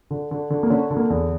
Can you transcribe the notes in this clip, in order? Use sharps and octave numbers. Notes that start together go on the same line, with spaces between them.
D3
D3
D3
A#3
D3 C#4
D3
A#3
E2